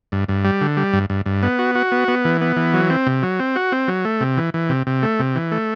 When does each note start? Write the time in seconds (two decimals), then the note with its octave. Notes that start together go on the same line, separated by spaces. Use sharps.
0.12 G2
0.28 G2
0.45 G3
0.61 D3
0.77 G3
0.93 G2
1.10 G2
1.26 G2
1.43 B3
1.59 F#4
1.75 F#4
1.92 B3
2.08 B3
2.25 E3
2.41 B3
2.56 E3
2.74 F#3
2.90 C4
3.07 C3
3.23 F#3
3.39 C4
3.56 F#4
3.72 C4
3.88 F#3
4.05 A3
4.21 C3
4.37 E3
4.54 E3
4.69 C3
4.87 C3
5.03 A3
5.19 C3
5.35 E3
5.52 A3